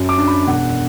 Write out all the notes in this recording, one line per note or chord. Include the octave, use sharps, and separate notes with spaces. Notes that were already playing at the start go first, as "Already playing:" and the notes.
Already playing: F#2
D6
D4
B5
E1 F#5